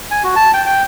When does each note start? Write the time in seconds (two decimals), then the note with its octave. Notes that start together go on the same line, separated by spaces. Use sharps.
0.11 G#5
0.24 F#4
0.36 A5
0.53 G5
0.66 G5